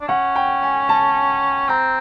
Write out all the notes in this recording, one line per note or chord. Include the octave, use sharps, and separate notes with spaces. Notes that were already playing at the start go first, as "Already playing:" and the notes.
D4
C#4 F#5
G5
G#5
A5
C4 A#5